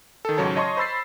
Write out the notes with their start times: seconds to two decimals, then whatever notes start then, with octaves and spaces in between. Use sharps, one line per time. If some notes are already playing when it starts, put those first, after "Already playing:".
0.25 D#3 A4
0.37 C#2 G#2 C#3 F#3 C#5 A5
0.56 C#5 D#5 A5 C6 C#6
0.77 C5 B5 E6 A6 C7